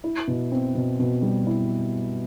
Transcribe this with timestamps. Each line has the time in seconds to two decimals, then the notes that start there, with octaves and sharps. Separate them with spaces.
0.04 E4
0.28 B2
0.52 C4
0.75 B2
0.99 B2
1.22 G3
1.47 E4